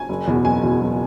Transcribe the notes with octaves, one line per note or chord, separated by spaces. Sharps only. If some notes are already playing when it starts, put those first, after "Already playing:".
Already playing: G#5
F#1
E2 B2
F#1 G#5
E2 B2
F#1